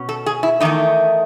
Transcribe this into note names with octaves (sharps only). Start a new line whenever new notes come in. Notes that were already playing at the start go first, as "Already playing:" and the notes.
Already playing: B2 C#4
A4
G#4
E4
E2 D#3 A3 D#4